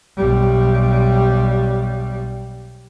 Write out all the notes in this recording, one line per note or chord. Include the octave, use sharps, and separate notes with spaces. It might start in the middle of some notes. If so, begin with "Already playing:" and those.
B1 G3